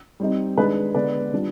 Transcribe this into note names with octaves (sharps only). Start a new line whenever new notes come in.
G3 C4 D#4
D#3 G#3 D4 B4
D3 G#3 B3 B4 D5
D#3 G3 D4 F4